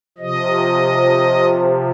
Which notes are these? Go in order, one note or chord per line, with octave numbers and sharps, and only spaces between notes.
C3 F3 D#5